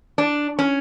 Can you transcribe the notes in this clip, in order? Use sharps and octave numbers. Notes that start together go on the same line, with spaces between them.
D4
C#4